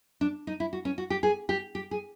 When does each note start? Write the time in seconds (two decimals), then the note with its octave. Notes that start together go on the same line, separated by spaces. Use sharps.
0.21 D4
0.47 D#4
0.60 E4
0.73 F#4
0.85 C#4
0.98 F#4
1.10 G4
1.23 G#4
1.49 G4
1.75 G4
1.91 G#4